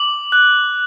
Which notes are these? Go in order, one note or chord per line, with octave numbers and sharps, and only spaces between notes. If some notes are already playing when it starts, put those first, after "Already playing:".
Already playing: D6 F#7
F#6